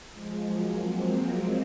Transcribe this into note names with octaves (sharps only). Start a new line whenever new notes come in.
F3 G#3
F#3 A#3
G#3 C4
F#3 A#3